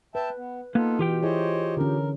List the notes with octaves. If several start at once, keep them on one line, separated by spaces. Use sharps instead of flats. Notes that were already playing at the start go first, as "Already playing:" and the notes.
B4 E5 G5 A5
B3
A#3 B3 D#4 F4 A4
B2 E3 F4 G4 G5
E4 G#4 C5 C#5 D#5
D3 C#4 A#4